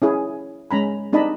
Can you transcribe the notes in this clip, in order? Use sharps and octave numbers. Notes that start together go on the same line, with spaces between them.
C#4 E4 G#4
G#3 C#4 A#5 B5
C4 D4 D#4 D#5 A5 B5